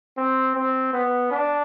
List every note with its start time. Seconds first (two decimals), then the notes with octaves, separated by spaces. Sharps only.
0.18 C4
0.55 C4
0.93 B3
1.31 D4